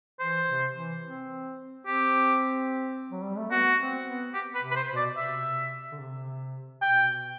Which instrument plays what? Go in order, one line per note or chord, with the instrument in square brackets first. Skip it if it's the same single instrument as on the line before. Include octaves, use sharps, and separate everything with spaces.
[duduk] E3 [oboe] C5
[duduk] C3
E3
C4
[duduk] C4 [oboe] G4
[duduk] F#3
G3
A3
[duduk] B3 [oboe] F#4
[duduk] C4
B3
[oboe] G4
B4
[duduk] C3
[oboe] B4
C5
[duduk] B2
[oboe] D5
[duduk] C3 [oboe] E5
[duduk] D3
C3
[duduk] B2 [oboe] G5